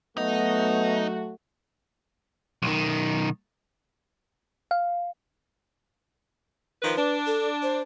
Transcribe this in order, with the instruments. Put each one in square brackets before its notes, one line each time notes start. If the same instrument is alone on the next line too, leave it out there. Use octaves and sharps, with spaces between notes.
[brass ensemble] F#3 A3 F#4 [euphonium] B3 [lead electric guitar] D#4
[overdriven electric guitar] B1 D#3
[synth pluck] F5
[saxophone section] D#3 F3 B4
[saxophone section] D4 [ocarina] B4
[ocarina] A4
C5